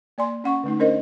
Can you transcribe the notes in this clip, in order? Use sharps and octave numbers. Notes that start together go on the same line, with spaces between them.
A#3 D5 G#5 C6
C#4 F#5 C#6
D3 A3 D#4
C#4 D4 A#4 C5 D#5